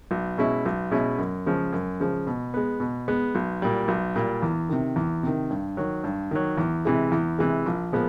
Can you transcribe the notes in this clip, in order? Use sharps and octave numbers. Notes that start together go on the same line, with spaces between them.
B1
B2 G#3 C#4 E4
B1
B2 G#3 C#4 E4
F#2
C#3 F3 G#3
F#2
C#3 F3 G#3
B2
G#3 B3
B2
G#3 B3
B1
A#2 G3
B1
A#2 G3
E2
C3 D#3
E2
C3 D#3
G2
D#3 F#3
G2
D#3 F#3
E2
C3 E3 G#3
E2
C3 E3 G#3
A#1
A#2 F3 G#3 B3